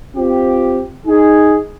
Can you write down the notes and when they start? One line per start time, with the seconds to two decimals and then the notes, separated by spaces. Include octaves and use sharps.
0.16 C4 F4 G4
1.05 D#4 G#4